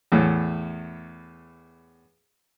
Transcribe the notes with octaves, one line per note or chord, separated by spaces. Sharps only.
E2 A2